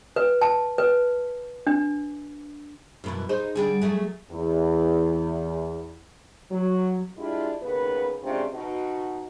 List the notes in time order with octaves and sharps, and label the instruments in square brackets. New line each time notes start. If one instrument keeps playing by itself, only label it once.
[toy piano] B4
A5
B4
D4
[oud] F#2 B2 E3
D#4 G#4 C5
D3 G3 G#4
F#3 A3 G#4
[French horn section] E2
F#3
G#3 D4 E4 F4 G4
D#2 C#3 B3 B4
C3 G#3 C#4 D4 F4
B2 D#4 F#4